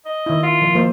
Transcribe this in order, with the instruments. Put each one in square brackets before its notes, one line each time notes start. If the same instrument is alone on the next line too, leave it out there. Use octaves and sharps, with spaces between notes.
[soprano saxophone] D#5
[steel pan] D#3 E4
[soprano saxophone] F4
[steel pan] F3
F3 A#3 C5